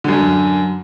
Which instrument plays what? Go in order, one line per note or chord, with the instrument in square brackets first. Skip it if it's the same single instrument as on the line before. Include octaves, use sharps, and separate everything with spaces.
[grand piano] F#2 D3